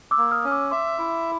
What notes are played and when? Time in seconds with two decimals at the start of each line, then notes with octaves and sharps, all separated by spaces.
0.11 D6 E6
0.18 A#3
0.31 D#6 F6
0.44 C#4 F6
0.51 D6 E6
0.71 E5 C6 D6
0.98 E4